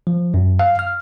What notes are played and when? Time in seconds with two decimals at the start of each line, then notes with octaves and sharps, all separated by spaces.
0.07 F3
0.34 F#2
0.59 F5
0.79 F6